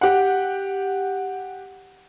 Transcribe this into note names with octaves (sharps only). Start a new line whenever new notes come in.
G4 F#5